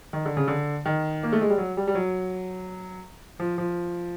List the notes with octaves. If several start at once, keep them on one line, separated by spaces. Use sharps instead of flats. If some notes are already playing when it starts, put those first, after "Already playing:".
D#3
D3
C#3
D3
D#3
A#3
A3
G#3
G3
F#3
G3
G3
F#3
F3
F3